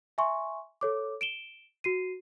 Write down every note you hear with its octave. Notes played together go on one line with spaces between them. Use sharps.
E5 G#5 C6 C#6
A4 C#5 D6
D7 E7 G7
F#4 C7 D#7